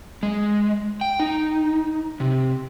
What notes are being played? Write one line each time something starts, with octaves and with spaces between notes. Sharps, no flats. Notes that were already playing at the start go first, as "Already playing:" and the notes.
G#3
G5
D#4
C3